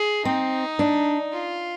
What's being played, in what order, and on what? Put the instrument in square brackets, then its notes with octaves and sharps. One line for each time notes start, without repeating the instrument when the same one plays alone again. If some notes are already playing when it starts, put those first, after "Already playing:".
Already playing: [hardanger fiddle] G#4
[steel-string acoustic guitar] C4 [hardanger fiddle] D#4
[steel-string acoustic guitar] D4
[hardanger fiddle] F4